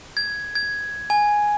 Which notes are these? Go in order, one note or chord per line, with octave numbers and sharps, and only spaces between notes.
G#6
G#6
G#5